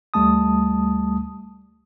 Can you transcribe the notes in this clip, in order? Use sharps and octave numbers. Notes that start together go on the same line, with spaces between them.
D2 G3 A3 A5 D#6